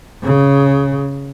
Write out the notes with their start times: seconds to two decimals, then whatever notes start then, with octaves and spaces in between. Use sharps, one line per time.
0.24 C#3